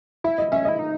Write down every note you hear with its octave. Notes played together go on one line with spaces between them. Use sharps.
E4 E5
D#5
C#4 E5
E4 D#5
D#4